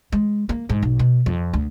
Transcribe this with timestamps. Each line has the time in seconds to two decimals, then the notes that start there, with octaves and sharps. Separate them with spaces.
0.13 G#3
0.49 A#3
0.70 G#2
0.83 B1
0.99 B2
1.26 F2
1.53 D2